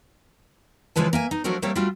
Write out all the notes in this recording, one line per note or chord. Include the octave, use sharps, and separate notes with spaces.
C#3 E3 F3 G#3 B4 A5
A#3 E5 G#5
D#4
F3 F#3 A3 D4 F#4 A#4
G3 A3 A#3 C4 G4 C#5
G3 A3 D4 F4 F#4